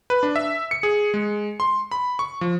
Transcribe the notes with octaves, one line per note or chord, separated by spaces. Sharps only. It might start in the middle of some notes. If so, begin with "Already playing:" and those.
B4
D4
E5
C#7
G#4
G#3
C6
B5
C#6
F3